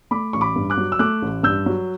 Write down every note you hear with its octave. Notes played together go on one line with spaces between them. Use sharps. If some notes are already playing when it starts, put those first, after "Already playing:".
A3 B5 D6
A1 C#6
B5 D6
G2
D6 F#6
F#3
E6
A3 D6 F#6
A1
G2 E6 G6
F#3